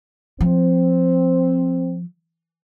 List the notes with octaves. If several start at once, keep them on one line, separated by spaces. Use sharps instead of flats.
F3 C4